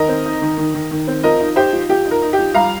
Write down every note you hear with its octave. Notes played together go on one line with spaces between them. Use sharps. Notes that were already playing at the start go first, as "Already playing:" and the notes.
Already playing: D#3 A#4 D#5
C4
D#4
D#3
D#3
D#3
D#3
C4
F3 A#4 D#5
D#4
D#4 G4 C5
F3
F3 G4
D#4
A#4
D#4
G4
F3
G3 F5 A#5